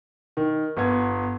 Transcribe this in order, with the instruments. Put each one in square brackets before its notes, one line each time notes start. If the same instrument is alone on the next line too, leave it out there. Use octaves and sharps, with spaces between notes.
[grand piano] D#3
G1 B3 G#6